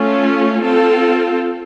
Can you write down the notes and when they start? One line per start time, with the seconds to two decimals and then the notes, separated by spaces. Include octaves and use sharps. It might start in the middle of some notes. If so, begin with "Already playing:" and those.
Already playing: A3 C#4 F4
0.62 C4 F4 A4